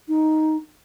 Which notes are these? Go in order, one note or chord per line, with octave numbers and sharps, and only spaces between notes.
D#4